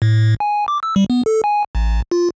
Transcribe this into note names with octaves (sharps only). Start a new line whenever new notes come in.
A2
G#5
D6
E6
G3
B3
A4
G#5
A1
F4